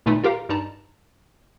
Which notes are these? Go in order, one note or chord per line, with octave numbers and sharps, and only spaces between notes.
G#1 A#2 A3 D#4 B4
F4 G4 A#4 F5 A#5
G2 D#4 A5 A#5